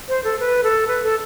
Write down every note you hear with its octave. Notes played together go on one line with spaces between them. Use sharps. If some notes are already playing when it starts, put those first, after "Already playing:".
C5
A4
B4
A4
B4
A4